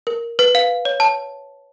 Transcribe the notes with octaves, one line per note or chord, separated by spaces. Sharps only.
A#4
B4
F5
C#5
A5